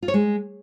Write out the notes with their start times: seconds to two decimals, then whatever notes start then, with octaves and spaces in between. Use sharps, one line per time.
0.02 F4
0.08 C#5
0.14 G#3